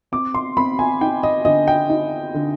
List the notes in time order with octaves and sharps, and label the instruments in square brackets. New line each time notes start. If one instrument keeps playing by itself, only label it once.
[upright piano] C4 D6
C6
C4 B5
G#5
D#4 G5
D#5
D3 D#5
G5
D#4
D3